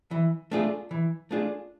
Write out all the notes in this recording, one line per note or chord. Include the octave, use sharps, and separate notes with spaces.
E3
A3 D4 F4 G#4
E3
A3 D4 F4 G#4